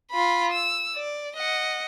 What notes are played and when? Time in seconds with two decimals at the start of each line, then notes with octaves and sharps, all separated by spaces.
0.11 F4 B5
0.52 E6
0.96 D5
1.36 D#5 F#5